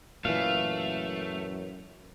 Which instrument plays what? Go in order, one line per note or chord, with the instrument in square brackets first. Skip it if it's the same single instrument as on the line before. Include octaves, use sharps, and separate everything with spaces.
[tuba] F#2 [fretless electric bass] A#2 E3 [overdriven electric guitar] A3 [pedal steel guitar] F5